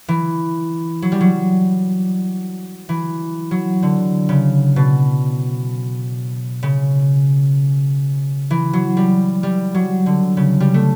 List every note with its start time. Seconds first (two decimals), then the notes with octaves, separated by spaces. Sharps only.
0.08 E3
1.02 F#3
1.12 G3
1.20 F#3
2.89 E3
3.51 F#3
3.82 D3
4.29 C#3
4.76 B2
6.63 C#3
8.51 E3
8.73 F#3
8.97 G3
9.43 G3
9.74 F#3
10.06 D3
10.37 C#3
10.60 G3
10.74 A3